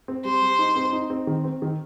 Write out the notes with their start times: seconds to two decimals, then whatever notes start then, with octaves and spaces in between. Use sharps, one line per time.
0.08 C4
0.25 G3 C5
0.42 G3
0.59 D#4
0.76 C4
0.93 D#4
1.10 C4
1.27 D#3
1.44 C4
1.62 D#3